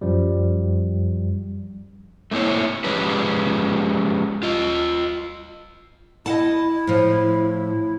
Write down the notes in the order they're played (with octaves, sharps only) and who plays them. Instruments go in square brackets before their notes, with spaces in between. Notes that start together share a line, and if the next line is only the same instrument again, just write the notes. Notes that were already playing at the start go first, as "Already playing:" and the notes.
[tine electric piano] F#2 F3 G3
[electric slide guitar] A3 A#3 C4 E4 C#5
F3 G#3 C#4 G4 G#4 B4
F4 D#5
[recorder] E4 [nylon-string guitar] D#5 F#5 A5
[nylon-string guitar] A2 F3